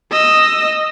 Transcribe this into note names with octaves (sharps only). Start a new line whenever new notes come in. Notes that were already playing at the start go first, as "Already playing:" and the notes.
D#5 E6